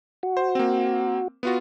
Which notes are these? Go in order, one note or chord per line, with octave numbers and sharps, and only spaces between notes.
F#4
C5
A#3 C4
B3 F4 F#4